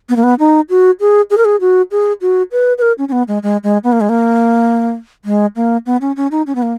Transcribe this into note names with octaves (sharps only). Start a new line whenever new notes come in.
B3
A#3
B3
D#4
F#4
G#4
G#4
A#4
G#4
F#4
G#4
F#4
B4
B4
A#4
C#4
C#4
B3
G#3
G#3
G#3
B3
A#3
G#3
A#3
G#3
A#3
B3
C#4
C#4
D#4
C#4
B3
A#3